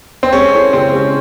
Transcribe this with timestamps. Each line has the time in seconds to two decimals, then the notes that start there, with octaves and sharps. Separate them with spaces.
0.23 C4
0.32 G#3 C#4
0.53 C#4 E4 A4 C5
0.73 C#3 C4
0.93 G#3 C#4